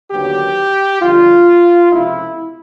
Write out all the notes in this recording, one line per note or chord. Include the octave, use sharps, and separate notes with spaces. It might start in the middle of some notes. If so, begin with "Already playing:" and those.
D#2 D3 F#3 B3 G4
F2 D3 G3 F4
C#2 C3 F3 A3 E4